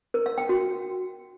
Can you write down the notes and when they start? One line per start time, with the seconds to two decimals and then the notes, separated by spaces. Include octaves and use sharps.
0.14 A#4
0.26 F5
0.38 G5
0.49 F#4